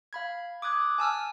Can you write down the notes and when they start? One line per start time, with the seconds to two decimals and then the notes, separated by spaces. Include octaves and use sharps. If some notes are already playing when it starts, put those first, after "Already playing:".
0.13 F5 B5 G#6
0.62 D6 D#6 F#6 G#6
0.98 G#5 A5 E6 F6